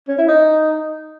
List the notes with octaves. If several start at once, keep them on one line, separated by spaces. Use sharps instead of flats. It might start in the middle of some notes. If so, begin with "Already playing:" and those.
C#4
E4
D#4